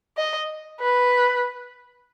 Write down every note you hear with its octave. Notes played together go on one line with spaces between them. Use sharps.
D#5
B4